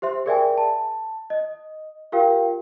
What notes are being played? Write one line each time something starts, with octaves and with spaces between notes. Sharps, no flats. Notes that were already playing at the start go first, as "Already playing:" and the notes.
G4 C5 E5 C6
G#4 A#4 D5 E5 G5 G#5
A5
D#5
F4 G4 A#4 F5 G5